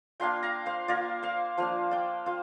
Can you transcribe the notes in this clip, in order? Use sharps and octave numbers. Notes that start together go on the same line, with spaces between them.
A#3 D4 F4 G5 C6
F5 A#5
C5 F5
A#3 F4 A#4 D5
C5 F5
F3 A#3 D4 C5 F5
D5 G5
F4 C5 F5